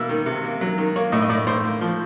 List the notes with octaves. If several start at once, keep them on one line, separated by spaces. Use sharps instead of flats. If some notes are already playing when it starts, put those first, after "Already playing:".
Already playing: B2 A#3 E5
D#3
C3
A#3
F#3
D#3
A#3 C#5
A2 D#5
D#5
A2 D5
A2 C5
A#3
F3